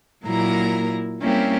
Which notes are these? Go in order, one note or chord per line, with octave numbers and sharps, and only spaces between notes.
A#2 F#3 A#3 E4 A#4 A#5
G3 A#3 C4 C#4 E4 G4